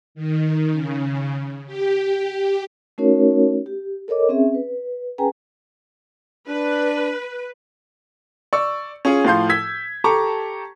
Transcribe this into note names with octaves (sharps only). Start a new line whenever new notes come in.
D#3
C#3
G4
A3 C#4 D#4 F#4 A#4 C#5
G4
A4 A#4 C#5 D#5 D6
C4 C#4 G#4 E5
B4
C#4 G#4 B4 G5 G#5 A#5
D4 B4
D5 C#6 E6
C#4 F4 G#4
A2 F3 F5 C6 G6
E6 G#6 B6
G4 A4 A5 A#5 C#6 D6